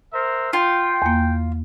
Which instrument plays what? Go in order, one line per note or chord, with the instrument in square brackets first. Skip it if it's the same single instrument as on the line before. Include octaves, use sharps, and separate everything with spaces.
[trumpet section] A#4 C5 E5
[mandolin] F4 [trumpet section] G5
[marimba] E2 A#3